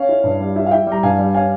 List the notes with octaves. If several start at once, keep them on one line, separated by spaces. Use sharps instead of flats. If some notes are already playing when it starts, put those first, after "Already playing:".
Already playing: C#4 C#5 F5
E4
G2
G3
E4
F5
E4 E5 G5
G3
A#5
G2 F5 G#5
G3
C#4 F5 G#5